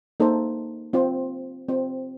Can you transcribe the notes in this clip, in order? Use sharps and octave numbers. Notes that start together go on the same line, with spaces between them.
A#3 D#4 A4 C5
C4 F4 C5
C4 F4 C5